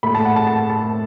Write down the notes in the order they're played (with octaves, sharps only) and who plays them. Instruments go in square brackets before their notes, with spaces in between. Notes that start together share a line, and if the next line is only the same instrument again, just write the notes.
[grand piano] A2 A3 B5
A5
F#5
A5
A5
A5